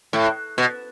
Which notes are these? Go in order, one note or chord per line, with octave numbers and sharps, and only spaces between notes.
A2
B2